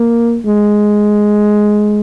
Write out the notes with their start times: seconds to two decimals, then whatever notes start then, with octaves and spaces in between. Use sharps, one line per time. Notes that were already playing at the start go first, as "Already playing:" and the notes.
Already playing: A#3
0.45 G#3